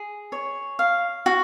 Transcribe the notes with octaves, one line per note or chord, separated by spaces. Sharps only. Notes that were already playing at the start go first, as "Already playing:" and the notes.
Already playing: G#4
C#5
F5
F#4